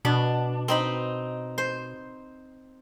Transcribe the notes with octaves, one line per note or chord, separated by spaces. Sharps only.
B2 D4
C4 D#4 B5
C5